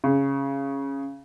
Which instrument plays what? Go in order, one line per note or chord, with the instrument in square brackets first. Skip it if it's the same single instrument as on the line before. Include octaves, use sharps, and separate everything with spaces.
[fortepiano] C#3